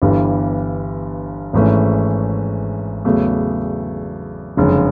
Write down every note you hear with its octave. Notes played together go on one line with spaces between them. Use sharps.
G1 G2 E3 G3
G#1 G#2 E3 A3 C#4
E2 C#3 F#3 A3
F#1 F2 D3 F3 G#3